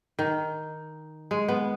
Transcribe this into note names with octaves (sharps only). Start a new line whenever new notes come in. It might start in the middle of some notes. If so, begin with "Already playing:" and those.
D#3
G#3
B3